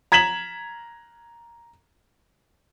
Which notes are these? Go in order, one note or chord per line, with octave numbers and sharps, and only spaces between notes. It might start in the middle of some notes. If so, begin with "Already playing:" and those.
A#5 G#6 B6 E7 F#7